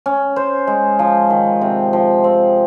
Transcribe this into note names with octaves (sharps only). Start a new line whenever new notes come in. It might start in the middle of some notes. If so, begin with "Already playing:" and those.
C#4
C5
G#3
F3
D#3
C3
F3
C4